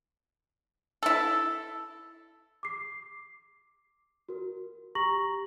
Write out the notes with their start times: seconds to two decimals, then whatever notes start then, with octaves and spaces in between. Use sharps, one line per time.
1.03 E4 A4
2.63 D6 C7
4.29 F#4 A#4
4.95 G4 A#5 C#6 A#6 F#7